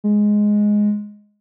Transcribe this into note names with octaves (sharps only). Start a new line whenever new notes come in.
G#3